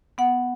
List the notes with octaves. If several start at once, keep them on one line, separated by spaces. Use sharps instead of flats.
B3 F#5